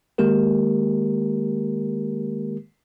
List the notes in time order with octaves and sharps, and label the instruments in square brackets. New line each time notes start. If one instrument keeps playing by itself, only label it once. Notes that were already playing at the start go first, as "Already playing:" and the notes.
[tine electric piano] D#3 G#3 A#3 G4 A#4